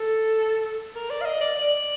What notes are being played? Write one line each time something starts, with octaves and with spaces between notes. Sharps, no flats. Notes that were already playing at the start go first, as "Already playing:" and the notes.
Already playing: A4
A#4
D5
F5
D#5
D5
D5